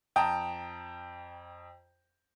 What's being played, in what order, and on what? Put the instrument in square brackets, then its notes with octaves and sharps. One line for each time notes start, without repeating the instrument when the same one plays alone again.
[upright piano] F2 G5 A5 A#5 D#6